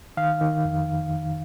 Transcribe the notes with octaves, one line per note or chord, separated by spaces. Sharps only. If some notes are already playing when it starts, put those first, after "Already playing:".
D#3 F5
D#3
F2